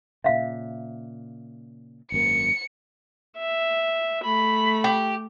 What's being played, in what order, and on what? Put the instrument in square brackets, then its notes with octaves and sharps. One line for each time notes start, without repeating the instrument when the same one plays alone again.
[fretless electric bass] A#2 C#3 [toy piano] E5 F5
[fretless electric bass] G#1 F#2 A#3 [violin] C#7
[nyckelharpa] E5
[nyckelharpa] A3 [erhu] B5
[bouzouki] G4